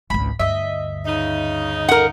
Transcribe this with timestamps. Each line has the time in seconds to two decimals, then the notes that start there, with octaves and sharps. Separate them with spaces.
0.10 G#1 C#2 B5
0.40 D2 G2 D#5 E5
1.06 C#3 D#4
1.88 A#4 F#5